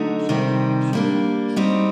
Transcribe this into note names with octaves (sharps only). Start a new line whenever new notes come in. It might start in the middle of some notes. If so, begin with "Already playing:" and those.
Already playing: D3 F#3 A3 D#4 F#4
C3 D#3 G3 C4
G3 A#3 D4
G3 C4 D#4 F#4